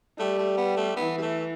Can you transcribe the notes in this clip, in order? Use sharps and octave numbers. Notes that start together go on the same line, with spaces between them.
G3 A3
A3
B3
A3
E3 B3
G3
A3